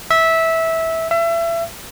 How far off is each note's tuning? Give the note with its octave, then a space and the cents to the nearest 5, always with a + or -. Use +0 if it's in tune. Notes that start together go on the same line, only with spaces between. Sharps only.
E5 -15
E5 +30